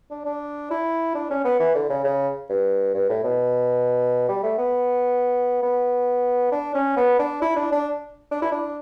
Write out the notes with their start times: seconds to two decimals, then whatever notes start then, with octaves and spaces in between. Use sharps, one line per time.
0.11 D4
0.25 D4
0.71 E4
1.15 D4
1.30 C#4
1.45 B3
1.60 E3
1.75 D3
1.90 C#3
2.04 C#3
2.49 G2
2.95 G2
3.09 A2
3.24 B2
4.29 G3
4.43 A3
4.58 B3
5.63 B3
6.52 D4
6.74 C#4
6.97 B3
7.19 D4
7.42 E4
7.56 D4
7.72 D4
8.31 D4
8.42 E4
8.52 D4